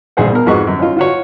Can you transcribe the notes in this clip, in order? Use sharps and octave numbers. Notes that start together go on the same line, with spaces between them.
A#1 G2 G#4 C5 F#5
B2 A#4
F2 G#2 F#4 B4 D#5 C#6
F#2
C#4 D#4 F4
F4 F#4 C#5